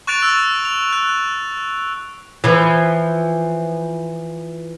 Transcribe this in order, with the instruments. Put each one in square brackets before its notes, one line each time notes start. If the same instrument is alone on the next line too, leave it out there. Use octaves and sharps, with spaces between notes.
[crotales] C#6 F#6 A6 D7 F7
E6
F7
F#6
[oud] E3 F3